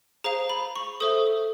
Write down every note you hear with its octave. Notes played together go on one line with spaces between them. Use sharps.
G#4 C5 F5 A#5
B5
C#6
A4 C5 E5 D#6